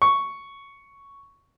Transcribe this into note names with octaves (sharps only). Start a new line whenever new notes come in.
C#6